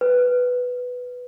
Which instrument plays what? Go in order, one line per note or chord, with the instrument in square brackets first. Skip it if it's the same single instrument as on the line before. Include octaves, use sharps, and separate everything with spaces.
[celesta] B4